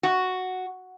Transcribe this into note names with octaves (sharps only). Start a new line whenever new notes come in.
F#4